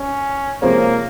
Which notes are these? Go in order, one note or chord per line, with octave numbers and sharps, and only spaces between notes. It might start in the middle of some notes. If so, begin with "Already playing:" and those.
Already playing: C#4
C3 F3 G#3 A#3 C#4